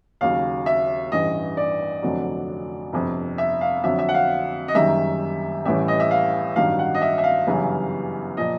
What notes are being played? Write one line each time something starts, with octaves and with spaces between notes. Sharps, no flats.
D#2 C#3 F#3 F5
E5
A1 G2 E3 D#5
D5
F1 F2 D3 F#3
G1 F2 C3
E5
F5
F2 D3 F#3 E5
E5
F#5
F5
D#5
F#1 F#2 D#3 G3 E5
A1 A2 E3 G3 E5
D#5
E5
F5
A1 G2 D#3 F#3 F5
F#5
D#5
E5
E5
F5
G1 F#2 C#3 E3 G3
A#2 F3 D#5